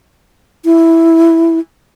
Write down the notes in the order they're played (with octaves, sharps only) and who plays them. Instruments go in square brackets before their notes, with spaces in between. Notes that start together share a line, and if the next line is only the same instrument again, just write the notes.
[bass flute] E4